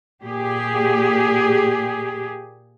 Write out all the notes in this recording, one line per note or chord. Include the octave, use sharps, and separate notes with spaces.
A#2 G4 G#4